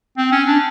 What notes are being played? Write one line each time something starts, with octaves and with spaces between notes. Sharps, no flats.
C4
C#4
D4